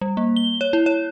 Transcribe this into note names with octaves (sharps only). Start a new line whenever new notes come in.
G3
A#3
G7
C#5
E4
C#5